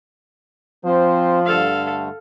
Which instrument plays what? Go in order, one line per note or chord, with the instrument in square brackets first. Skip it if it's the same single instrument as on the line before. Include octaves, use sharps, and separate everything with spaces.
[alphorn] F3 [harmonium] C4 C5
[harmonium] G2 D3 A3 [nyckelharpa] A4 F5